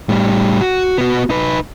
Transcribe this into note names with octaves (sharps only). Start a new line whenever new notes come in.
A2 G3
F#4
B3 F#4
D#4 B4